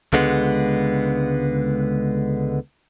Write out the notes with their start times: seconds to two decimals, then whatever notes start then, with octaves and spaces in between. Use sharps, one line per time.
0.13 C#2 D3 G#3 B3